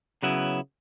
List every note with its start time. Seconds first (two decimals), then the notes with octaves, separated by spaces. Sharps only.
0.23 C#3 F#3 B3 E4